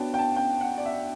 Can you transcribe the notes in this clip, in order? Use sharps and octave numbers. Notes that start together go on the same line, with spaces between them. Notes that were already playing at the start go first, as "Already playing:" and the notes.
Already playing: B3 D4 F#4 C#5 G5 A5
G5
A5
G5
F#5
D5
E5